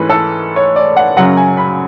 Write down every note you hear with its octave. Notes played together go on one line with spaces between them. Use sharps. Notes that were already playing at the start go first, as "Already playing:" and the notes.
Already playing: G#2 E3 A3 C#4 B4
A4
C#5
D5
F#5
F#2 C#3 F#3 F#5
G#5
B5